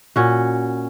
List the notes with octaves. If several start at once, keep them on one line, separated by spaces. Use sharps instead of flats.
A#2 C#4 F#4